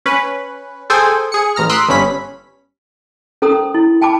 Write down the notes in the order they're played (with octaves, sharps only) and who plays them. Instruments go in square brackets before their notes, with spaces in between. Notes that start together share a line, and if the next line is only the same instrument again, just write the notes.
[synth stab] C#4 B4
G#4 A4 C5 G5 G#5
G#4 C#7
A1 A#5 F6
C6 D#6 E6 F#6 B6 D7
G1 G2 C#4 B5 B6
[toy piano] C#4 A4 A#4 C5 A#5 D#6
E4
G5 A5 B5 D6